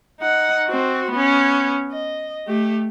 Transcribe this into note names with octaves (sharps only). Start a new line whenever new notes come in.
D#4 F#5
C4 F#4
B3 C#4
D#5
A3 G4